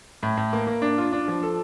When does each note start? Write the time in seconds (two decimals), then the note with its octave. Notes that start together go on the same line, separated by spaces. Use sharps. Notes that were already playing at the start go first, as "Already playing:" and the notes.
0.23 A2
0.37 A2
0.53 A#3
0.67 A#3
0.82 D4
0.98 F4
1.12 D4
1.28 F3
1.43 A4